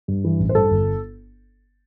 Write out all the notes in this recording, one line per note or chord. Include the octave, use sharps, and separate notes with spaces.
G2
E3
A1
C5
G2 A4
G1